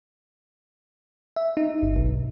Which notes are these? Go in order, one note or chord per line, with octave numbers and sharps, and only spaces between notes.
E5
D#4
G1
B1